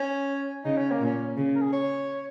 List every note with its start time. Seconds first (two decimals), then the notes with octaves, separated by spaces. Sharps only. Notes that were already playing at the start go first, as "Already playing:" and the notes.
Already playing: C#4
0.65 C#3 D#4
0.77 C#4
0.91 A#3
1.01 A#2 C#4
1.37 C#3
1.55 A#4
1.61 G#4
1.73 C#5